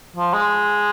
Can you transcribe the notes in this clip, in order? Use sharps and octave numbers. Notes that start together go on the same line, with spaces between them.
F3
G#3